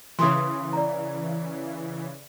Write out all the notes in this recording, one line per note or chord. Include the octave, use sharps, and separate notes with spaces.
C#3 E3 C6 D#6
D5 A#5